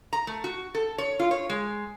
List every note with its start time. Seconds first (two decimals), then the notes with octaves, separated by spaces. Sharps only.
0.13 A#5
0.27 A3
0.44 F#4
0.75 A4
0.98 C#5
1.19 F4
1.31 C#5
1.50 G#3